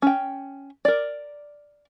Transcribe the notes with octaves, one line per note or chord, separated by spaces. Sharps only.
C#4 G5
A#4 D5